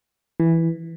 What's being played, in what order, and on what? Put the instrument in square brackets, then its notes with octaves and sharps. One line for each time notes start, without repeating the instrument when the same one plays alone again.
[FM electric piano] E3